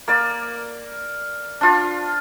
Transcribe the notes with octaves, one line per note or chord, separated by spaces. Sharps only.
A#3 D5
D4 F4